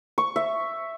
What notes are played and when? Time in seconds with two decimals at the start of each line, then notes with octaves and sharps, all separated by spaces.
0.18 C#6
0.36 E5